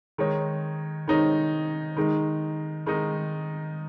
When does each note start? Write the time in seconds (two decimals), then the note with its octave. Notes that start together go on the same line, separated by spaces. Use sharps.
0.18 D#3 G#3 D#4 C#5
1.08 D#3 G#3 D#4 C#5
1.97 D#3 G#3 D#4
2.86 D#3 G#3 D#4